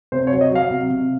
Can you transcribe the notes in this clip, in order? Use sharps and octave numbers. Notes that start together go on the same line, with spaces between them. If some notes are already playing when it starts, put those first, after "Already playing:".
C3 C5
C#5
F#3
D#5
F#3 F5
C3
C3